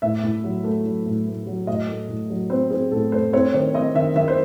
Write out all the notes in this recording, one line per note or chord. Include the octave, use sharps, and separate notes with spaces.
A2 E5
A2
F#3
A3
F#3
A2
A3
F#3
A2 D#5
A3
A2
F#3
C4 C5
C4 G#4
A2 A4
A3 C5
C4 C#5
D#3 C#5
C4 D#5
D#3 E5
D#3 E5
C5